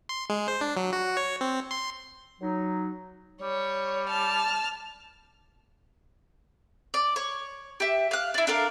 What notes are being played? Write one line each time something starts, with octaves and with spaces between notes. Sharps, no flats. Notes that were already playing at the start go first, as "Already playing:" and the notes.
C6
G#3
C5
D4
F#3
F#4
C#5
C4
C6
F#3 D#4
G3 C#5
A5 F6
D5
C#5
G4 E5
F5 F#6
D4 E4
D4 A4 A#4 F5